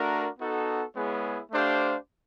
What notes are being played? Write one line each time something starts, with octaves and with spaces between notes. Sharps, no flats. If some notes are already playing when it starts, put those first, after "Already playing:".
Already playing: A3 D4 F#4 A#4
B3 D#4 F#4 A4
G#3 B3 E4 G#4 C#5
A3 D4 G4 C5 F5